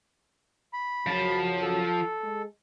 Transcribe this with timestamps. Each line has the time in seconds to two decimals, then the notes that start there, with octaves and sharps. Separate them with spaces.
0.73 B5
1.07 F#2 C#3 F3 F#3 A5
1.62 A4
2.23 G#3